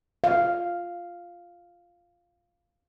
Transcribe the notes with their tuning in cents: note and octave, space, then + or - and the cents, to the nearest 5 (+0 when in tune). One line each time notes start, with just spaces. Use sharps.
F5 -5